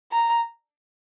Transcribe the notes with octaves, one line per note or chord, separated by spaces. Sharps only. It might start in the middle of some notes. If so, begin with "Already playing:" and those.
A#5